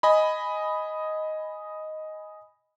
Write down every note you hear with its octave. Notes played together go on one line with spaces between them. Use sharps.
D#5 G#5 B5